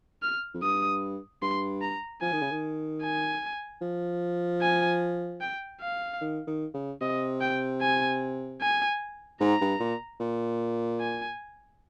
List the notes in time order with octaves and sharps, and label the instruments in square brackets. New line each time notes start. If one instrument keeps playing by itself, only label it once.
[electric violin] F6
[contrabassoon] F2
[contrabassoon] G2 [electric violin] D#6
[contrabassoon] G2 [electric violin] C6
[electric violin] A#5
[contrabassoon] F3 [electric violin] G#5
[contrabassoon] D#3
C#3
D#3
[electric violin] G#5
[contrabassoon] F3
[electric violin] G#5
G5
F5
[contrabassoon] D#3
D#3
C#3
[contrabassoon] C3 [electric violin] D#5
[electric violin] G5
G#5
G#5
[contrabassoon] G#2 [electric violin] A#5
[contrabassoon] G2
A#2
A#2
[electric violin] G#5